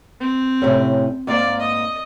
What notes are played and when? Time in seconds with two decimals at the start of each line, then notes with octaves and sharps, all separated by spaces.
0.20 C4
0.62 A2 C3 C#4
1.27 G#2 A#3 D5 F5
1.60 D#5